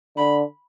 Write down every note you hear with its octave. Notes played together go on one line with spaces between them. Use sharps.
D3 B5